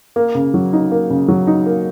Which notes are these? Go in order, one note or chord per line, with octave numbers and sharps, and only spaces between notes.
A#3
C#3
F#3
D#4
A#3
C#3
F#3
D#4
A#3